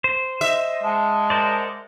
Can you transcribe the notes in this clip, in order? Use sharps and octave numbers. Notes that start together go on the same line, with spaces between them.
C5
D#5 E5
G#3 F#5 A5
A#4 C5 D5